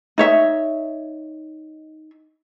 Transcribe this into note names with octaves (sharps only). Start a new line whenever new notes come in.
D#4 C#5 E5